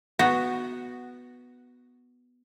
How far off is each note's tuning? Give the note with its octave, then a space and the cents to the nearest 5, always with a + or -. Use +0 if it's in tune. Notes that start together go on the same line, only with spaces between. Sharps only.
B3 +0 F#4 +0